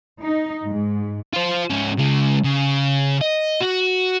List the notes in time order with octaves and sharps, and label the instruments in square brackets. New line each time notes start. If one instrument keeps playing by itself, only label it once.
[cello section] D#4
G#2
[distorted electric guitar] F4 C5
G#2 C#4
C#3 G#3
C#3
D#5
F#4